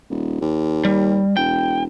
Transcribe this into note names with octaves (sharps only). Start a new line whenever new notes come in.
D#1
D#2
G3
E1 G5